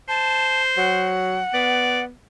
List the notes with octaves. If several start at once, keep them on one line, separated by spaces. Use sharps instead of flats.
C5 A5
F#3 F#5
B3 D5